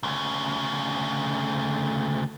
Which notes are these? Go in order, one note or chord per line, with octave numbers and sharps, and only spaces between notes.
D2 C#3